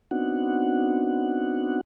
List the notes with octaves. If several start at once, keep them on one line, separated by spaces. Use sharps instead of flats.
B3 C4 D4 D#4 F#4 F#5